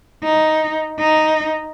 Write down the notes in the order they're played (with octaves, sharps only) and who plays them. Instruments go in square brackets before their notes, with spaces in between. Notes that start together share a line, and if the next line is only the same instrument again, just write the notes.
[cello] D#4
D#4